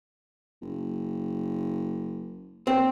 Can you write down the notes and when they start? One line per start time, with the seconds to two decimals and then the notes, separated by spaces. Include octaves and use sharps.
0.62 F#1
2.67 C4